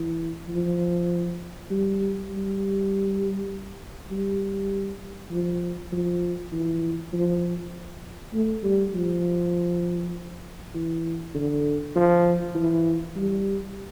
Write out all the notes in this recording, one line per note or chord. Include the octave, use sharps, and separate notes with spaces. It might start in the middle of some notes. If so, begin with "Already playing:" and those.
Already playing: E3
F3
G3
G3
G3
F3
F3
E3
F3
A3
G3
F3
E3
D3
F3
E3
G3